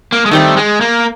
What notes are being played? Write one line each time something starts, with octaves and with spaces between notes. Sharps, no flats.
A#3
G#3
D#3 G3 A3 C4
G#3
A#3